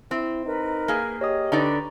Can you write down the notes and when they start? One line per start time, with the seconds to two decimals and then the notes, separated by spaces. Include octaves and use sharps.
0.11 C4 E4
0.45 D#4 A#4 B4
0.88 A#3 G#4
1.21 G4 C#5 D#5 D#6
1.52 D3 D#4 B4 D5 A#5 C#6